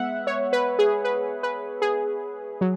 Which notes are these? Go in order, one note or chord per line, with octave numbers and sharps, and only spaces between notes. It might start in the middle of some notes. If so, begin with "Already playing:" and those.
Already playing: G#3 B3 E5 F#5
C#5
B4
G#4
B4
B4
G#4
F#3